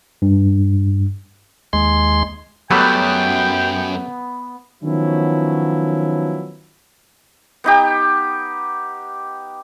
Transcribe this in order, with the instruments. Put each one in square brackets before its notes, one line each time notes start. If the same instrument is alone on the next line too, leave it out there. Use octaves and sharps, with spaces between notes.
[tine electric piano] G2
[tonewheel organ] D#2 G#3 C6
[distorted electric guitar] F#2 [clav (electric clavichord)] F#3 G3 A3 [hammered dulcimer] B3 [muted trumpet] G5
[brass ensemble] D#3 F3 F#3 B3 C#4 E4
[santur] B3 D#4 G4